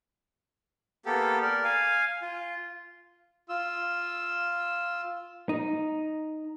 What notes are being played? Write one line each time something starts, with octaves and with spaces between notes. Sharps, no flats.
A#3 B3 G4 A4
A#4 D5
F5 G#5
F4
F4 E6
D#4